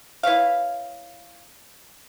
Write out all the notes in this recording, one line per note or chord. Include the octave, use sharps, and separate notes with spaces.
E4 B4 C#5 F5